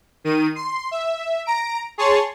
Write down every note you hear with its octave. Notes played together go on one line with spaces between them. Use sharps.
D#3 D#7
C6
E5
A#5 D7
G#4 C#5 A5 C6 C#6